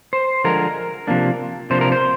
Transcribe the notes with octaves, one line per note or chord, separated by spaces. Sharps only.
C5
D3 F3 G#3 A#4
C3 F3 A#3 D4
C3 F3 A#3 D4 C5
A#4
C5